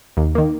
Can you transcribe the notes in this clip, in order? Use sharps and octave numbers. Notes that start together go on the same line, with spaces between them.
D#2
D#3 A#3